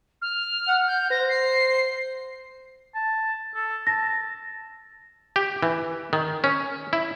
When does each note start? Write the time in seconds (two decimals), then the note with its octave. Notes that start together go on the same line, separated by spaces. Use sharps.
0.21 F6
0.68 F#5
0.87 G6
1.10 C5 A#6
1.29 C7
2.95 A5
3.55 A4
3.87 A5 A#6
5.36 G4
5.63 E3
6.13 D#3
6.44 C#4
6.93 E4